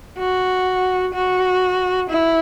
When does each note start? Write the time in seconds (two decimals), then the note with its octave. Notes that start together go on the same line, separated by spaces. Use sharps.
0.19 F#4
1.14 F#4
2.10 E4